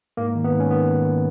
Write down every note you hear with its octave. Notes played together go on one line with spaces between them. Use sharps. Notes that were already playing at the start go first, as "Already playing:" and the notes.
G#2 A#3
D#3
B3
G#2
C#4
D#3 B3